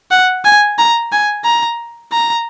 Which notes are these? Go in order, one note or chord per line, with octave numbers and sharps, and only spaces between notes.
F#5
G#5
A#5
G#5
A#5
A#5